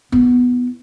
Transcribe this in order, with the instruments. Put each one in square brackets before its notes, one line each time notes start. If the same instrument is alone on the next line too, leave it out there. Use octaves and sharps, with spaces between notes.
[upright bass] B3 E4